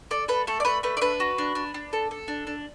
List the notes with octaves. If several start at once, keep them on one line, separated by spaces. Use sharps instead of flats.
A4 D5
A4 B4
A3 A4
D5
A3 B4
A3 B4
D5
D4 B4
F#4
D4
D4
D4
A4
A4
D4
D4